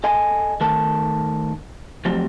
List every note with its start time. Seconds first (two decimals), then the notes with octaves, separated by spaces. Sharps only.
0.04 A4 D#5 G#5
0.61 D#3 A3 A4 A#4 A5
2.05 F3 F#3 A3 C4 G4